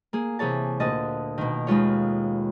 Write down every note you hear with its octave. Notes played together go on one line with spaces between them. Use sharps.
A#3 G#4
C3 E3 G#4 C#5 A5
D2 A#2 D#5 A5
B2 D#3
D#2 G#3 F4 C#5